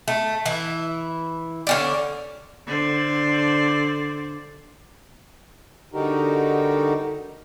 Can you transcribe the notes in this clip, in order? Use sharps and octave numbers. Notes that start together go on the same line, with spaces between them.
A3
E3 E4
D3 C#4 D5
D3 C5 D5
D3 G3 D#4 F#4 G4 A#4